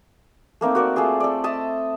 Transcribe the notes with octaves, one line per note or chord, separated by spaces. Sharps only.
A3 A#3 C4 D#4
F#4 A#4 D5
A3 F4 G#4 C5
A4 D5
D#5 E5 A5